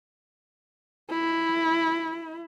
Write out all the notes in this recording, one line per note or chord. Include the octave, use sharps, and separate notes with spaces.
E4